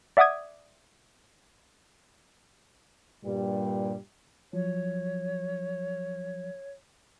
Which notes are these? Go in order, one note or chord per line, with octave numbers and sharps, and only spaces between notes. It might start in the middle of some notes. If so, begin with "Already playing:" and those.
D5 E5 F#5 D6 D#6 G#6
G2 A#2 G3
F3 F#3 C#5